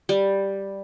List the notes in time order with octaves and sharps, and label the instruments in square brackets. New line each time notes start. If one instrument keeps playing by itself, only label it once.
[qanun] G3